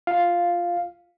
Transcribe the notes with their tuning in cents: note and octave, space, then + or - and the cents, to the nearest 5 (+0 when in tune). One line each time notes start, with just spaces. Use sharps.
F4 +0 F5 +0